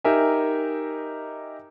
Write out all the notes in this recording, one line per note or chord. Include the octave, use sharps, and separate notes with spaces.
D#4 G4 A#4 E5 G#5